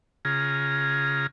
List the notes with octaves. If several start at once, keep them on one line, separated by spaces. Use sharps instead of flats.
C#3 F4 G#4 A#5